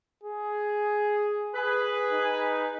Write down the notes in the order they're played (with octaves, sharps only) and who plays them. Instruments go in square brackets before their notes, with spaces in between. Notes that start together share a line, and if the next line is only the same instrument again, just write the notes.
[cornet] G#4
[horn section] G#4 B4
[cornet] D#4